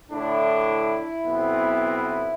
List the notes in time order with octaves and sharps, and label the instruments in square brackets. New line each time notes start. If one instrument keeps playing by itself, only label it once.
[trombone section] A2 D3 D4 [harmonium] E4
[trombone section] B1 B3 C4